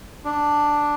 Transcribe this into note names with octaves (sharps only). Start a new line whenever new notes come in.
D4